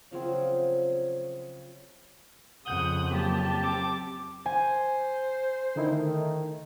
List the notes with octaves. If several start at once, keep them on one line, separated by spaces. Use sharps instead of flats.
C#3 F3 F#3 C4
F2 C#3 F#5 D#6 G6 F#7 G7
F#3 A#3 G4 A5
C4 D6
C5 G#5
D3 D#3 A3 D#4 E4